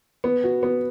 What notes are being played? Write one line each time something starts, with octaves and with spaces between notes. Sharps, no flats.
B3
F#4
B3